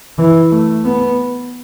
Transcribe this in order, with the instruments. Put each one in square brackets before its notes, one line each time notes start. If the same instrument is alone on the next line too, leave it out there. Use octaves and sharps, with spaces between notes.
[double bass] E3
A3
B3